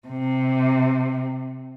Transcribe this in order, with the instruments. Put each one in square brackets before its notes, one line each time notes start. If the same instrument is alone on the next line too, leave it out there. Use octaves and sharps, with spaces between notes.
[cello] C3